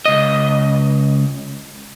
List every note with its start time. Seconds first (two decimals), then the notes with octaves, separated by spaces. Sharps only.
0.06 C#2 D#5